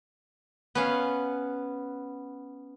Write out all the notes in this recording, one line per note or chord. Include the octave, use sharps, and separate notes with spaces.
B3 C#4 F5